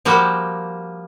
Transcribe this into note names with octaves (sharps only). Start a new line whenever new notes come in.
F3 G3 A#3 F#4